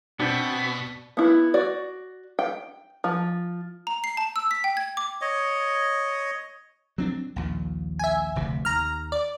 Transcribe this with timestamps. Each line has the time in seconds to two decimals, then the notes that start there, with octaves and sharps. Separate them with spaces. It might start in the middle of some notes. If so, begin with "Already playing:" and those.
0.20 B2 B3 C4 D4 B6
1.17 B3 E4
1.54 F#4 D5
2.39 G5
3.04 F3
3.87 A#5
4.04 C7
4.17 A5
4.36 E6
4.51 B6
4.64 G5
4.77 G#6
4.97 D6
5.21 C#5 D#5
6.98 F#3 C4 D4
7.36 A#1 D#2 A#2
7.99 E5 G#5
8.36 F1 D2 C3
8.65 D#2 A#5 F6
9.12 D5